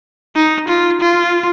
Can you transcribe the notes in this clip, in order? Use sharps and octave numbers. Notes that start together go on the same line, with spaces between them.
D#4
F4
F4